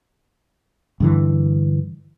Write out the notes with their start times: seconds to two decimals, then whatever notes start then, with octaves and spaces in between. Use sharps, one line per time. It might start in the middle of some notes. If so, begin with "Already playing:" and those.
1.00 G2 D3 E3